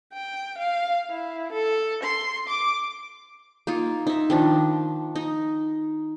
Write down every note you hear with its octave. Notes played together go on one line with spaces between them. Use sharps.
G5
F5
E4
A4
C6
D6
A#3 D#4 F4
D#4 E5
D#3 F3 D4
D#4